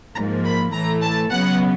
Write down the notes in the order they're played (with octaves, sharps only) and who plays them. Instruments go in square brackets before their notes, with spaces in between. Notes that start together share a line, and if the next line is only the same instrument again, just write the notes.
[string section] G#2 F3 A#3 A#5
B5
A2 E3 A3 A#5
A5
C#3 F#3 B3 F#5